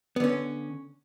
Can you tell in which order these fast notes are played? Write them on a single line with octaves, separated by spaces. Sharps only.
B3 D3 C#4